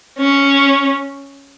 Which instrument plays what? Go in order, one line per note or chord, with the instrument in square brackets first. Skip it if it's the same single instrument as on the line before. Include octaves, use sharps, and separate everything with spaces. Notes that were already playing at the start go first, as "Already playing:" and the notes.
[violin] C#4